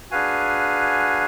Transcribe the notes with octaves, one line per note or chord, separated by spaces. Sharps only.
D4 F#4 G#4 B4 F5 G#5